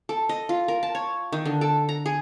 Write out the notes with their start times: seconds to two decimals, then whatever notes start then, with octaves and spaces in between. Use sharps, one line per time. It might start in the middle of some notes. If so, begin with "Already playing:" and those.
0.09 A4
0.29 D#5
0.49 F4
0.68 A#4
0.83 A5
0.95 C#5
1.32 D#3
1.45 D3
1.61 A4
1.89 A#5
2.06 G#4